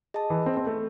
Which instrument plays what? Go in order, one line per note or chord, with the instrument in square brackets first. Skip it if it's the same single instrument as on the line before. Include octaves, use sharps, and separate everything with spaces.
[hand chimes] G#4 D#5 A5
[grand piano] E3
C4
C4
A3